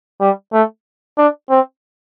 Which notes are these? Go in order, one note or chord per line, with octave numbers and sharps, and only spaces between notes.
G3
A3
D4
C4